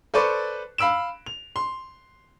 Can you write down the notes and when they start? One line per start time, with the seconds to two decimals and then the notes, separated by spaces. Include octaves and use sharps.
0.14 A4 B4 C5 D5 C#6
0.78 F5 B5 E6 D7 E7
1.26 F7
1.56 C6